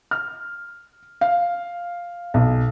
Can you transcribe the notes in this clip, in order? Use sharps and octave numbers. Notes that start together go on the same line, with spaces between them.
F6
F5
B1